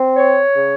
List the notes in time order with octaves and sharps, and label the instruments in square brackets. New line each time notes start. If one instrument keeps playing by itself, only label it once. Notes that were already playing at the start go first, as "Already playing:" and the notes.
Already playing: [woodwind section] C4
C#5
C#3